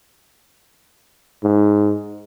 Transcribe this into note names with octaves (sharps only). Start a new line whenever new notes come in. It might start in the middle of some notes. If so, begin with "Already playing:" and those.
G#2